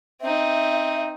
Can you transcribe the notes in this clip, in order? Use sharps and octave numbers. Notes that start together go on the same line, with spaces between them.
C4 D#4 E5